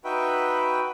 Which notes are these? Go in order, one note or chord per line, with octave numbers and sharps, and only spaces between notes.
D#4 F#4 B4 E5 G5 B5